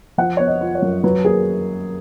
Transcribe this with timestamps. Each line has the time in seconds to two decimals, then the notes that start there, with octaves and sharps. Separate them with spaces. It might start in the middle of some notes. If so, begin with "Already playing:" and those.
0.18 F3 F#5
0.37 B3 C#5
0.47 D#5
0.61 F4
0.75 C#5
0.82 F#2
1.03 F#3 B4
1.25 A#3 G#4